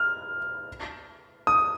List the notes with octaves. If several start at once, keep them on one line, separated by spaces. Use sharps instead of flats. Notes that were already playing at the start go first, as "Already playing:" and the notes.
Already playing: F6
D#6